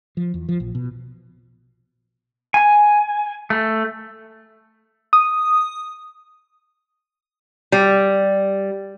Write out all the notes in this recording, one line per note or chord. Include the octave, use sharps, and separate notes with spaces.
F3
E2
F3
A#1
B2
G#5
A3
D#6
G3